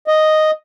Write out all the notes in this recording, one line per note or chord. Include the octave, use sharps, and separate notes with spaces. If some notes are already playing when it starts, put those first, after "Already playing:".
D#5